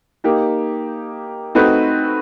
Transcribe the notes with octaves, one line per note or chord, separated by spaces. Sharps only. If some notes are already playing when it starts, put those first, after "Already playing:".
A#3 D#4 G4
A3 C4 D#4 F#4 B4